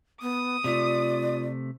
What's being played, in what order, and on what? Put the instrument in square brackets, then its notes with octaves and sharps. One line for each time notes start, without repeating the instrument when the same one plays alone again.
[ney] B3 [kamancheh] D#6
[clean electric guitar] C3 A3 [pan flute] F4 [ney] D5